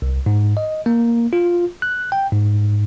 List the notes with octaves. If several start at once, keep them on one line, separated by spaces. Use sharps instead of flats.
C2
G#2
D#5
A#3
F4
F#6
G5
G#2